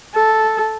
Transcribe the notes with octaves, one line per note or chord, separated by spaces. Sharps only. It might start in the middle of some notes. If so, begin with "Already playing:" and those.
A4